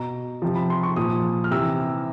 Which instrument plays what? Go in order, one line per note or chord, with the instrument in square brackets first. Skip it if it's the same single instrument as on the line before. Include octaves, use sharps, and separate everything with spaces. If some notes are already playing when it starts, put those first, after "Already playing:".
Already playing: [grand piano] B2 A#5
C3 F3
B5
C6
C#6
A#2 F3 D#6
F6
C3 E3 E6